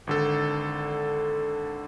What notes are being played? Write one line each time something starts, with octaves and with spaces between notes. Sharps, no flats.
G#1 D3 A4